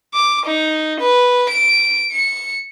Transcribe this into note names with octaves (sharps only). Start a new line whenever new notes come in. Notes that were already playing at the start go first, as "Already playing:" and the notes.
D6
D#4
B4
D7
C#7